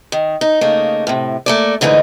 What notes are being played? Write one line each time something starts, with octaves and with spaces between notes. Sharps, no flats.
D#3
D#4
C#3 A3 A#3 D#4
A2 C3
A3 A#3 D5
G#2 D3 E3 A3 D#4